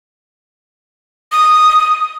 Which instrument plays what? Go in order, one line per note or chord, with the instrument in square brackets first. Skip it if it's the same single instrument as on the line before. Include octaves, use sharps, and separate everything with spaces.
[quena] D#6